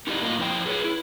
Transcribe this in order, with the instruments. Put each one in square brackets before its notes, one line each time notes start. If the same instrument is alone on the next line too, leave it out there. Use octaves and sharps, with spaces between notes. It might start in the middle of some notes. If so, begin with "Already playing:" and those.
[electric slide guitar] D#4 E4 G4 A#4 D5 D#5
A2 A#3 F4 A#4 D#5
F2 E4 C5 G5
G#4 B4 C#5
E4